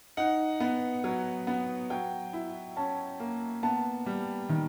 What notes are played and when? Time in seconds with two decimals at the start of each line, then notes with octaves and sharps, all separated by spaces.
0.17 D#4 F#5
0.60 B3
1.04 F#3
1.47 B3
1.90 F#3 G5
2.33 E4
2.77 C#4 A5
3.20 A#3
3.63 B3 A5
4.06 G3
4.49 D#3